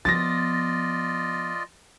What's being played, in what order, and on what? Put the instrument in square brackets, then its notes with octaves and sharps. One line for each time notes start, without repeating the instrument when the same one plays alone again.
[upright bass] F3 B3 [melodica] F4 D5 D#5 [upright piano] A6 A#6